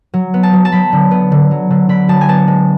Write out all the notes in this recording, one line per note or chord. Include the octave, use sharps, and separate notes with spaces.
F#3
B3
A5
F#3
A5
F#3 B5
D3
B3
D3
F#3
D3
D3 B5
F#3 A5
G#5
B3 A5
G#3